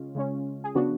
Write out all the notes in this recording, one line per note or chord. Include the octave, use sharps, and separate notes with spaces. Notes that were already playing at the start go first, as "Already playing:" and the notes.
Already playing: C#3 G#3 C#4 F4
C#3 G#3 C#4
G#4
C#3 F3 B3 D4 F#4